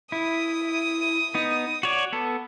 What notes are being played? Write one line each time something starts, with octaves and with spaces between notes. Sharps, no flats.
E4 D#6
B3 D#4
F#4 C#5 D5
B3 A4